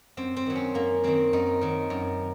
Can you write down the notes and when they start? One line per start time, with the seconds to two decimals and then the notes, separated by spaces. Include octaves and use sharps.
0.17 F#2 C4
0.37 C4
0.46 D#3 F#3
0.56 C#4
0.74 F#2 A#3
1.04 D#3 F#3 C4
1.33 F#2 D#4
1.61 D#3 F#3
1.90 F#2